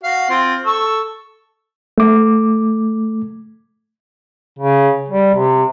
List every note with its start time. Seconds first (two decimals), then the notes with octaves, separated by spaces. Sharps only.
0.04 F#4 F5
0.30 C4 F4
0.66 A4 C#6 E6
1.98 A3 D6
4.59 C#3
5.09 G3
5.34 C3